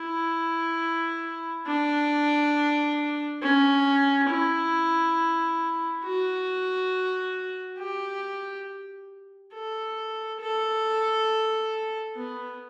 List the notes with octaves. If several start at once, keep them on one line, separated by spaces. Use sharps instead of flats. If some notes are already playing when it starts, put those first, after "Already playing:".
Already playing: E4
D4
C#4
E4
F#4
G4
A4
A4
B3